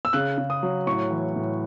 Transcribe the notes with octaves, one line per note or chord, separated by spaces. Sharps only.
E6
C#3 F#6
C#3
D#6
F#3
A2 C#6
E3
A2